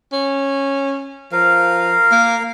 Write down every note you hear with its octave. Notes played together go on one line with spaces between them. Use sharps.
C#4
F3 A#4 F5
A#3